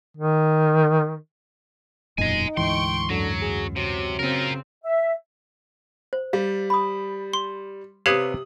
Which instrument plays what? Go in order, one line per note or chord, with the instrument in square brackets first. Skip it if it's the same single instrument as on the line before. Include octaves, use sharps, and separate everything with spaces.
[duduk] D#3
[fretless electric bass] E1 F#2 A#2 [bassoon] D#4 [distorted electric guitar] D#5 G#5
[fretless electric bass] D2 G#2 E3 [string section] G5 C#6 [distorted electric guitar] C6
[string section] F#2 [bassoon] D3 [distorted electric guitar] F#3
[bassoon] G#4
[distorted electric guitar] C3 [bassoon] F#3
[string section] C#3 C4 [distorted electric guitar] F4 A#4
[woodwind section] E5
[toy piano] C5
[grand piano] G3 [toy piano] F5
[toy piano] B5 D#6
[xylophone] C6
[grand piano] C3 D#6 F#7 [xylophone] G4 G#6 [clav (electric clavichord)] B4 C#5 F5